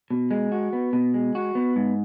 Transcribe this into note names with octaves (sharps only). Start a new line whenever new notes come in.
B2
G#3
F#4
B3
B2
G#3
F#4
B3
G#2